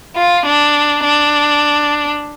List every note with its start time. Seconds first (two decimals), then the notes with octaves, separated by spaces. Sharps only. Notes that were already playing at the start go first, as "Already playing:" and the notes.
0.16 F4
0.46 D4
1.03 D4